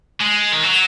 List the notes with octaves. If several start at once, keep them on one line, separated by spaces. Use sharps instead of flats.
G#3
D#3
F#3